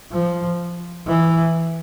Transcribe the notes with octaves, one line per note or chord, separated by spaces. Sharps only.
F3
E3